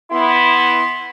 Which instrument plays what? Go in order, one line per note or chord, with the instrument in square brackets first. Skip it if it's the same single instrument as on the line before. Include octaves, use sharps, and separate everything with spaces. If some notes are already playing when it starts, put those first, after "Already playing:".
[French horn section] B3 E4 [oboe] C6